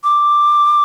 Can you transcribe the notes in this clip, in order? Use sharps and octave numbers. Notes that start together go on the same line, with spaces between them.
D6